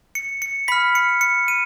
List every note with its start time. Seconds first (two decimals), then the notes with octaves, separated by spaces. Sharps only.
0.15 C#7
0.42 C#7
0.68 B5 F6 B6
0.95 C#7
1.21 C#7
1.48 D#7